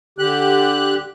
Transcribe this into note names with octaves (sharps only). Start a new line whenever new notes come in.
D3 G4 F#6